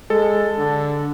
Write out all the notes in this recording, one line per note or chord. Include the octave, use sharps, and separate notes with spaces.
G#3 A4
D3